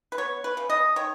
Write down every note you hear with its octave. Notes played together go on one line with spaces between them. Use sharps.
B4
B3 C#5
B4
C#3
D#5
D#3 C#5